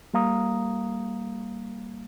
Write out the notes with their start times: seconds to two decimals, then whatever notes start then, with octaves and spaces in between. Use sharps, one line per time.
0.14 G3 A#3 F5 A#5 D#6